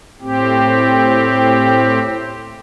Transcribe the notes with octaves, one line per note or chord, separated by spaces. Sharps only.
A2 C4 G4